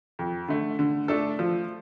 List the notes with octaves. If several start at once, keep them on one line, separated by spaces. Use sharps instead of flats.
F2
D3 A3
D3
A3 D4 A4
F3